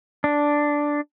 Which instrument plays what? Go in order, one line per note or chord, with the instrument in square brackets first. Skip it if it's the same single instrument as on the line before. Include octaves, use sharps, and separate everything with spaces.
[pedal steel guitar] D4